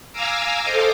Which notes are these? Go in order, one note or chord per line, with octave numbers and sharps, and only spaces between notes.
F5 G#5 A#5 D6 E6
A4 C5 D#5 F5 D6